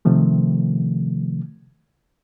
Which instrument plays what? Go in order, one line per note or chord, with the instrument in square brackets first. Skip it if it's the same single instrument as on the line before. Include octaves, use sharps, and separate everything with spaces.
[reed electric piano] C3 D#3 F3 A3